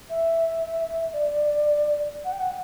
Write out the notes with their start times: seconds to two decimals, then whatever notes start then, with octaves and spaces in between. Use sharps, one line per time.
0.09 E5
1.13 D5
2.24 F#5
2.32 G5
2.40 F#5